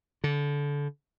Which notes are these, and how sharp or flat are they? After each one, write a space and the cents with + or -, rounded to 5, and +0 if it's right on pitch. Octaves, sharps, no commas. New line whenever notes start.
D3 -25